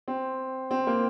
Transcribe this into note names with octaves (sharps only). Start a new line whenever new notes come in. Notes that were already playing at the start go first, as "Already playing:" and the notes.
C4
C4
A#3